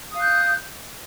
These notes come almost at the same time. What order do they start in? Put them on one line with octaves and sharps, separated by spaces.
D#6 F5 F#6 G6